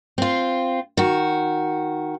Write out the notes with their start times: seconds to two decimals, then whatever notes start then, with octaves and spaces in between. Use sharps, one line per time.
0.18 C4 F4
0.97 D#3 F#4